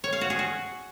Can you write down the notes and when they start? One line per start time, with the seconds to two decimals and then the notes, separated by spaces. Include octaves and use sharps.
0.04 C#5
0.13 F5
0.21 F#4
0.30 G#4
0.39 F#4